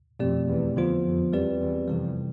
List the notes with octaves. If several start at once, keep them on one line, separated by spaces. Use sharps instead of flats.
F2 B2 A3 C4 G4 D5
E2
F2 D3 F3 B3 F4 C5
F2
E2 G3 C4 G4 B4 D5
E2
F2 C3 E3 G3